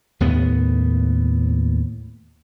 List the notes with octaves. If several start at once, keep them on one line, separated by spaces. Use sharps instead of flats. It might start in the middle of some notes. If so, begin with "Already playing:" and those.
D#2 A2 B3